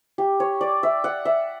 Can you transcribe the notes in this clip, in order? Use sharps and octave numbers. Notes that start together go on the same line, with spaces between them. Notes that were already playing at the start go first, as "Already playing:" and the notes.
G4
C#5
D5
E5
F#5
E5